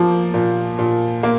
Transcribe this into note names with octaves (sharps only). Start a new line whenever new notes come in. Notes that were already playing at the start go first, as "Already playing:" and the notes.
Already playing: F3 A#3
A#2
A#2
A#3